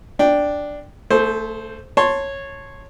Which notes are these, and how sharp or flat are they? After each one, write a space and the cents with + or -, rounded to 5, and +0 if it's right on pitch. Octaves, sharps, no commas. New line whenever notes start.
D4 +0 G5 +0
A3 +20 A4 -35 C5 +0
C#5 -10 A5 +5 C6 +0